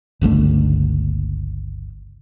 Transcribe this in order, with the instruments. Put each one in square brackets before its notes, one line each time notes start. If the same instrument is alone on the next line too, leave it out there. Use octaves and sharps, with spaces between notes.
[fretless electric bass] G1 C#2 D3 A3